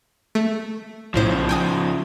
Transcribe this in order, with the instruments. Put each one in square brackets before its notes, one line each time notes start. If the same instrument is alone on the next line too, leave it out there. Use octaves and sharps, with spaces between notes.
[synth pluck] A3
[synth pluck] B1 A2 C5 [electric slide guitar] C#3 F3
[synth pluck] G5 G#5 D#6